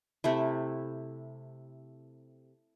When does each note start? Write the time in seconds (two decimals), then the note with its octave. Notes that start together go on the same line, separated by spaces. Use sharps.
0.24 C3 A3 E4